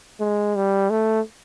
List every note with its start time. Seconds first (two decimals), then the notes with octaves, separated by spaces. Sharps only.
0.20 G#3
0.56 G3
0.90 A3